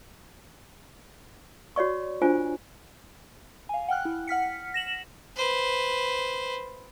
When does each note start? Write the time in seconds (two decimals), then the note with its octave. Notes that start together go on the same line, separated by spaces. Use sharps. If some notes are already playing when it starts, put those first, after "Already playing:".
1.76 F#4 C#5 D5 C#6
2.22 D4 F4 C5 G#5
3.69 F5 G#5
3.88 F#5 G5 F6 F#6
4.05 E4
4.28 F#5 F6 B6 C#7
4.74 A#6 E7 F#7
5.36 B4 C5